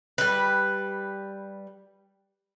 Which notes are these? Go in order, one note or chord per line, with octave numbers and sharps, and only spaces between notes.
G3 B4